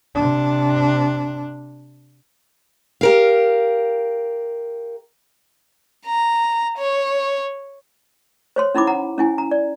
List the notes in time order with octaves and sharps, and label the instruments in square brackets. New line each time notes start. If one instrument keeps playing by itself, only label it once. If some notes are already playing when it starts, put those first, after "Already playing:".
[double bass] C3 D4
[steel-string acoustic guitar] G4 A#4 F5
[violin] A#5
C#5
[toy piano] C5 C#5 C6
C#4 D#4 E4 B5 D6
F#5 A#5
C#4 E4 G#5
A#5
D5